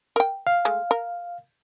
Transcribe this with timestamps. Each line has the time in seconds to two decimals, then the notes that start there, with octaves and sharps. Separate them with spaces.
0.16 A#4 G5
0.47 F5
0.65 G#3 A3
0.91 A#4